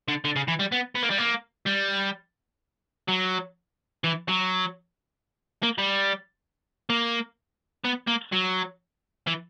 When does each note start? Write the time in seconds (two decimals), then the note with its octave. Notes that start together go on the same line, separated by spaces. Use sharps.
0.08 D3
0.25 D3
0.36 C#3
0.48 E3
0.59 G3
0.72 B3
0.95 B3
1.03 A#3
1.10 G3
1.18 A#3
1.66 G3
3.09 F#3
4.04 E3
4.29 F#3
5.63 A#3
5.78 G3
6.90 A#3
7.85 B3
8.08 A#3
8.33 F#3
9.27 E3